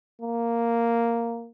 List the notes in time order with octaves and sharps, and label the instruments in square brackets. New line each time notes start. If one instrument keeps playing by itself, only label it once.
[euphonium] A#3